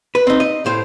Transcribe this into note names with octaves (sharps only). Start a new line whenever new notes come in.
B4
C4 D#4
D#5
A2 C5